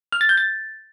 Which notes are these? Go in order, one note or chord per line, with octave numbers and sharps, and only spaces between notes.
F6
A6
G6
A6